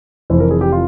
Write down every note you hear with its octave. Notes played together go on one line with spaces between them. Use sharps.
F1 F2 E3 C5
A#4
G#4
G4
F4